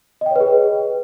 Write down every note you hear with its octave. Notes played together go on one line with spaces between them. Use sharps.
G#4 B4 C#5 D#5 G5